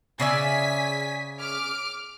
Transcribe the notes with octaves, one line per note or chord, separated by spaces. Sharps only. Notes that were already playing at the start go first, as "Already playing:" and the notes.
C#3 D5 E5 G#5 B6
D6 F6